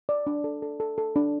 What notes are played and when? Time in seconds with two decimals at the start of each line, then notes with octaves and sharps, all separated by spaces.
0.09 D5
0.27 D4
0.44 A4
0.62 A4
0.80 A4
0.98 A4
1.16 D4